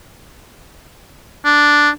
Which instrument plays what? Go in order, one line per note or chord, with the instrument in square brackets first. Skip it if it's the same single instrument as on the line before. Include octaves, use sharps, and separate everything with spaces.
[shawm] D4